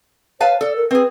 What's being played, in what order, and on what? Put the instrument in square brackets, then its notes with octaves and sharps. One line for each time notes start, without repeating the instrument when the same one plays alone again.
[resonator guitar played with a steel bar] B4 F5 A5 [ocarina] C#5
[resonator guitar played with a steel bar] A4 [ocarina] D5
[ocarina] A#4
[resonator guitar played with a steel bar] C4 G#4 [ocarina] B4